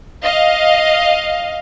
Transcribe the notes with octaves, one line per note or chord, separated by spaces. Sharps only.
D#5 F5